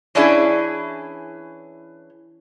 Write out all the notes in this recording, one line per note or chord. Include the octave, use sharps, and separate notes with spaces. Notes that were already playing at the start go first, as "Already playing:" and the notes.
E3 C#4 D4 E4 G#4